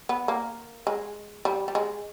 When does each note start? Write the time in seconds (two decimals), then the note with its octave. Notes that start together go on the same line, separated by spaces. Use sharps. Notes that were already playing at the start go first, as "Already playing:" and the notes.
0.09 B3
0.28 A#3
0.87 G#3
1.45 G3
1.68 G3
1.75 G#3